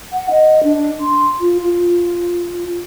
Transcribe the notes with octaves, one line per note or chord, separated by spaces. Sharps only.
F#5
D#5
D4
C6
F4
F4